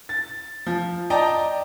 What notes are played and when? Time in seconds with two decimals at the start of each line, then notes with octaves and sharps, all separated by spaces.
0.09 A6
0.66 F3
1.10 D5 D#5 G5 A5 A#5